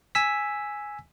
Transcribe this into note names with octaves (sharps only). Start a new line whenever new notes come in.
G#5 E6 B6